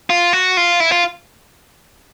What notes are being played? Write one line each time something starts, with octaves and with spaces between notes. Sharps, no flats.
F4
F#4
F4
E4
F4